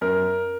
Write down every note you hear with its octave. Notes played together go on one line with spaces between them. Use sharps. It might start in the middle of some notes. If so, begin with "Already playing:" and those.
F#2 A#4